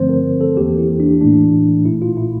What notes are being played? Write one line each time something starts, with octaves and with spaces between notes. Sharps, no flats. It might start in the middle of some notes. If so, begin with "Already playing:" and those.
Already playing: G2 D3 F3 A3 C4 C5
A#4
A4
E2 E3 A#3 G4
E4
D4
A2 E3 A3 D4
A#1 A#2 A3 E4
F4
E4